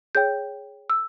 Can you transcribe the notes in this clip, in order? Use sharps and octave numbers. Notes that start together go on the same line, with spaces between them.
G#4 C#5 G5 G6
E6